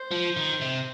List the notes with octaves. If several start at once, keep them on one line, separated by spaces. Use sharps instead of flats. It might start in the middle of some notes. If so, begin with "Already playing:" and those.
Already playing: C5
F3
D#3
C3